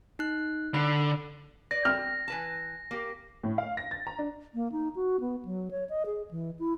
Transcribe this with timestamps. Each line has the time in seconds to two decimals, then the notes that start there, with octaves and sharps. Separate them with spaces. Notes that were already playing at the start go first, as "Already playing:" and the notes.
0.19 D#4 F#6
0.74 D3 B5
1.71 B4 D5 A#6
1.85 C4 F6
2.28 E3 B4 A5
2.91 A#3 G4
3.44 A2
3.58 F5
3.77 A#6
3.91 A6
4.07 A#5
4.19 D4
4.55 A#3
4.72 D#4
4.96 F#4
5.20 B3
5.45 F#3
5.71 C#5
5.89 D#5
6.06 G#4
6.31 E3
6.59 E4